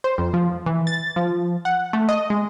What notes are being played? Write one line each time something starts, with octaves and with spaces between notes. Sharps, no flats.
C5
F2
F3
E3
A6
F3
F#5
A3
D#5
G#3